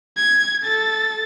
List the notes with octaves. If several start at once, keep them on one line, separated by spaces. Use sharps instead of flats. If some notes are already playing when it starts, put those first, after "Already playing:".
G#6
A4 A6